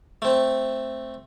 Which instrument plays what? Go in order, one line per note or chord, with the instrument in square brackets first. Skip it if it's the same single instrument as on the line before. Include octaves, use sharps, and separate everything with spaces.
[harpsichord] A3 C4